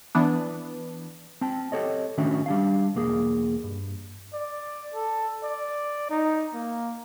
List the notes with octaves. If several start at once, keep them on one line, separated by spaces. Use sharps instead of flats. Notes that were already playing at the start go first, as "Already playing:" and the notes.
E3 B3 D4
C4 G5 A5
G4 A4 C#5 D#5
A2 D#3 C#4 D4 F#4 E5
G3 D4 F5
B1 E2 A#3 G#4
G2
D5
A4
D5
D#4
A#3